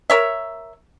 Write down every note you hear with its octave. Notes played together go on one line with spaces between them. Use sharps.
A#4 C#5 E5